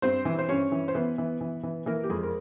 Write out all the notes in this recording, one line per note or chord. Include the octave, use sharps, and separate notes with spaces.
G2 C4 C5
E3
C5
G2 C#4 C#5
E3
C5
E3 B3 B4
E3
E3
E3
E3 A#3 A#4
G4
F2 G#3 G#4
A#4